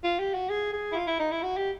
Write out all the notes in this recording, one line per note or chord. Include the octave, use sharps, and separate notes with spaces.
F4
G4
F#4
G#4
G#4
E4
F4
E4
D#4
E4
F#4
G4